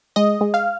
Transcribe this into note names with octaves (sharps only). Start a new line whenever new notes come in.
G#3 D#5
G#3
F5